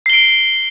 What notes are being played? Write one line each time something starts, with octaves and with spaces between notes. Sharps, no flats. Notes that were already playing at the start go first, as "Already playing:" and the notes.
C7 D7 G7